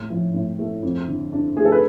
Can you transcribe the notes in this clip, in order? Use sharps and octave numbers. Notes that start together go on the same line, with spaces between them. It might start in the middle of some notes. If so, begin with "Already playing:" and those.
Already playing: A2
F3
A2
A3
F2
D3
D4
A3 G#4
A4
B4